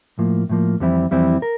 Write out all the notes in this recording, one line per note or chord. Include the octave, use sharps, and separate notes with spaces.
A2 F3 A#3
A2 F3 A#3
F2 E3 G3 C4 E4
F2 E3 G3 C4 E4
A#4